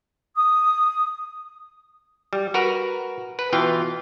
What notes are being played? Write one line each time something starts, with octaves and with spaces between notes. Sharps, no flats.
D#6
G3
F#4 A#4 B4 A#5
B4
B2 E3 F4 F5 G5